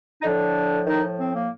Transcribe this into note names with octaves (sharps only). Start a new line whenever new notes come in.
D#4
A2 D3 F3 D4
D#3 D#4
C4
A#3